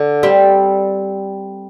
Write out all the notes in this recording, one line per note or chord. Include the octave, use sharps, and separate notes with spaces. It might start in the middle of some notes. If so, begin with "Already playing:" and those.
Already playing: D3
G3 C4